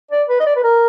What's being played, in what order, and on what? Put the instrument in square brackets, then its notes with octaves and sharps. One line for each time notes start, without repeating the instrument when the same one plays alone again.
[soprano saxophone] D5
B4
D#5
D5
B4
A#4